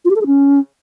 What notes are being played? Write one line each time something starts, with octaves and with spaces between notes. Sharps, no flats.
F4
G4
A4
G#4
C#4